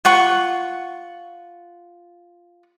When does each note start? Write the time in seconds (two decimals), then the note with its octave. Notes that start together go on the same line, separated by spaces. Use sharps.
0.05 F4 F#5 C#6